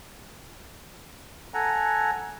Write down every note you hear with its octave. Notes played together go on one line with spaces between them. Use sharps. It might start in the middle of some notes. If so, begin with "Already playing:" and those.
A4 F#5 G#5 A#5